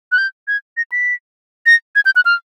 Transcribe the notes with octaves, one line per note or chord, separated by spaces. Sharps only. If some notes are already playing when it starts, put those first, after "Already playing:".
F#6
G6
G#6
A#6
B6
A#6
G#6
G6
F#6
F6